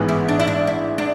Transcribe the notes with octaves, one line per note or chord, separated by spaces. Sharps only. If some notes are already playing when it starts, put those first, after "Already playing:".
Already playing: A1 G#2 E3 G#3 B3
E4
D4
E4
D4
E4
D4